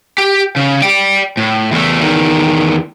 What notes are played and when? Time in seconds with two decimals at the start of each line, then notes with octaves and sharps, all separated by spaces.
0.18 G4
0.56 C#3
0.82 D5 G5
1.37 A2
1.72 E2 A3
2.00 E2 D#3